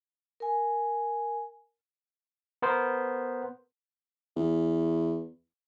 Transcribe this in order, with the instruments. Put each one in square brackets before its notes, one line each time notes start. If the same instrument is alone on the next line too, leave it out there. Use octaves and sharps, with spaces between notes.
[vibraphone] A#4 G#5
[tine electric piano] B3 A#4 C5
[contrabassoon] E2